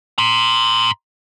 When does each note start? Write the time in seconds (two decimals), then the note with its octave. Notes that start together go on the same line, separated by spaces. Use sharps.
0.18 A#5 C6